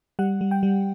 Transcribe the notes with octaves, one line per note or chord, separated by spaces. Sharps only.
G3 F#5
G3
G5
G3